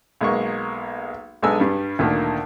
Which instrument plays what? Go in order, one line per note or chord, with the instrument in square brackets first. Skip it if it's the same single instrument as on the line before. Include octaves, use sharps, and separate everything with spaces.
[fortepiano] B1 G#3 A#3 C#6
B1 G#3 D4 A4 G#5 E6
G2 G3
D2 A#2 D3 D#3 A#3